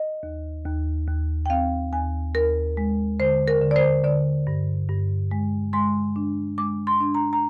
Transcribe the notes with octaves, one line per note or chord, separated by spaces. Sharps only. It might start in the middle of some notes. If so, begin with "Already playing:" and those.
Already playing: D#5
D#2
D#2
D#2
G5
C4 F5
D#2 G#5
D#2 A#4
G#3
D3 C5
A#4
D3
D5
C5
D3 D5
G2
G2
G#3
G#3 C6
D4
G#3 D6
C6
D4
A#5
A#5